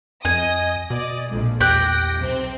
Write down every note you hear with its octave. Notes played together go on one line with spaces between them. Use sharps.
F2 D#5 G#5 D#6
B2 D5 D#5
A#1 F2 G#3
E2 G4 G5 F#6 A#6
B1 C3 C4